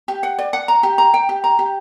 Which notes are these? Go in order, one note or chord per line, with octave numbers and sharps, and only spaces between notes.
G4
F#5
D5
F#5
A#5
G4
A#5
G5
G4
A#5
G4